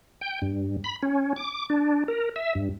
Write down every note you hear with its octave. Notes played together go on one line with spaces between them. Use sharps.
G5
G2
B5
C#4
D6
D4
A#4
E5
G2